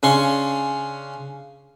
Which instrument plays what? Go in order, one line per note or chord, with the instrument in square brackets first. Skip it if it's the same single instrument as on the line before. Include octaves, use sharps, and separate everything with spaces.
[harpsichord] C#3 C#4 D4 C6 C#6